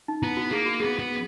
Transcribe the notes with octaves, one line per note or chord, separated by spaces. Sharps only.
D#4
B3 E4
F#4
A#3 G#4
F#4
B3 G#4
B3